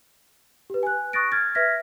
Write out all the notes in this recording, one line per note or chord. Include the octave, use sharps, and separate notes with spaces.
G4 B4
G#5 F#6
C#6 D#6 F#6 A6 A#6 D7
F6 G#6 A6
B4 E5 F6 G#6 A#6 B6